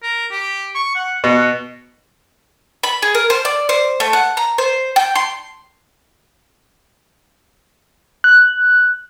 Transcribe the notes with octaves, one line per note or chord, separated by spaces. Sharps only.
A#4
G4
C#6
F#5
B2 F#5
B5
G#4
A#4
C5
D5
C5
A3
F#5
A#5
C5
G5
C6
F#6